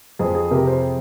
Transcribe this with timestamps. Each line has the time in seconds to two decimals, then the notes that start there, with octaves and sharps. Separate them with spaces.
0.19 F2 G#4 C5
0.35 G#4
0.51 C3 G4 A#4
0.67 G#4 C5